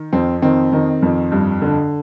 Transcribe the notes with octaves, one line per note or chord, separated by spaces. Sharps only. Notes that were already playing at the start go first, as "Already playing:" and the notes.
Already playing: D#3
F2 C4
D#3 C4
D#3
F2
G2
D3